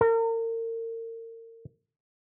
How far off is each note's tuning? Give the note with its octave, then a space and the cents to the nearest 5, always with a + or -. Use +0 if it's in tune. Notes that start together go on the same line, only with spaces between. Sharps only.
A#4 -35